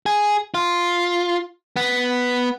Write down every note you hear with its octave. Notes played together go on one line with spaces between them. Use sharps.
G#4
F4
B3